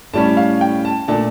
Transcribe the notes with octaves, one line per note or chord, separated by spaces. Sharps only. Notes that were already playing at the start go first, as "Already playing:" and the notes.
A2 G3 C#4 A5
F5
G5
A5
A#2 A3 D4 A5